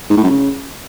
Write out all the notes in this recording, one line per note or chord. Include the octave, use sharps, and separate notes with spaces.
G#2
A2
F#2
C#3